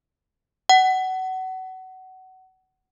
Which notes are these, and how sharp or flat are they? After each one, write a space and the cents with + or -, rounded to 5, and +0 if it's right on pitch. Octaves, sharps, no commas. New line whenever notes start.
F#5 +20